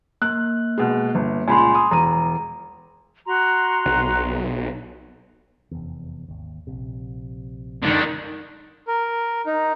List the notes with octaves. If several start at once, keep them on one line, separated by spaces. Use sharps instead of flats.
A#3 F#6
B2 G#3
G1
C#2 A#2 G#5 B5 C6
D#6
E1 A#5 D#7
F#4 A#5 C6
B1
F1 E2
G#1 D#2
A#1 C3
F#2 D3 D#3 G#3
A#4
D#4